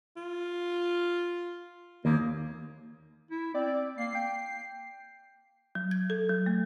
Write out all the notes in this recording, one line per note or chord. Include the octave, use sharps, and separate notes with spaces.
F4
D#2 A#3
E4
C4 D5
A#3 C7
G5
F#3
G#6
A4
F#3
A3